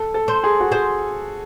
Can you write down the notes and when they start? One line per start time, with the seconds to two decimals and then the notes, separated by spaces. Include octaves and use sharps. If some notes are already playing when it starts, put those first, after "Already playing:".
Already playing: A4
0.14 A4
0.28 C5
0.44 G#4
0.60 F#4
0.72 G#4 C5